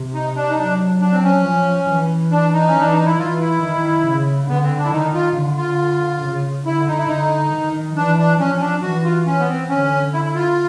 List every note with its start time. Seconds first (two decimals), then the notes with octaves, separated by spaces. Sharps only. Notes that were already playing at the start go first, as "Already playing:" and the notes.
Already playing: C3
0.14 D#4
0.36 D4
0.50 D#4
0.58 F#3 D4
1.01 D4
1.12 C4
1.23 C#4
1.45 F3
1.89 E3
2.31 D4
2.53 D#4
2.68 C#4
2.74 E3
2.81 D4
2.93 D#4
3.06 E4
3.18 E3 F4
3.40 E4
3.61 D#3
4.06 C#3
4.48 D3 B3
4.63 C4
4.78 D4
4.84 E4
4.91 D#3 D#4
5.14 F4
5.35 D3
5.57 F4
6.23 C#3
6.65 D3 E4
6.87 D#4
6.98 E4
7.07 D3 D#4
7.52 D#3
7.96 E3 D4
8.18 D4
8.39 F3 C#4
8.55 C#4
8.60 D4
8.82 E3 F#4
9.04 F4
9.26 C#4
9.40 B3
9.48 C4
9.69 D3 C#4
10.13 E4
10.25 E4
10.35 F4